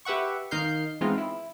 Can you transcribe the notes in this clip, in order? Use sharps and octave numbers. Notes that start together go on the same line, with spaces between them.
G4 B4 E5 F#5 C#6
D#3 D#4 A#4 F5 G6 C7
E3 G#3 B3 C4 D#4 F4
E4